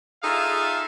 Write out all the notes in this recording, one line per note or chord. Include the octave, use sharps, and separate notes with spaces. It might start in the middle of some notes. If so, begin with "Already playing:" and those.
D#4 F4 G#4 A4 E5 F5